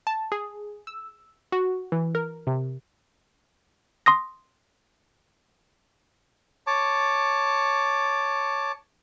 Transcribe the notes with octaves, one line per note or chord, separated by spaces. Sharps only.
A5
G#4
E6
F#4
E3
A#4
C3
C6 D#6 A#6
C#5 A5 D6